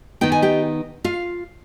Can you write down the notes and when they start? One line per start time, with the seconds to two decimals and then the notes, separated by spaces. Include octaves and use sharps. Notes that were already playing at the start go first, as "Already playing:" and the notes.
0.21 D#3 B3 D#4 G5
0.32 G#5
0.42 G4 G5
1.04 F4 F5